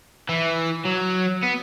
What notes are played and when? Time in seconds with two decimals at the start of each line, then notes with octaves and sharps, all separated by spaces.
0.29 E3
0.85 F#3
1.43 B3